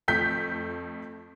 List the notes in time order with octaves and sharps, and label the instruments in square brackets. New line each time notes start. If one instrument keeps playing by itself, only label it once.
[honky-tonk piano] F2 A3 G6 B6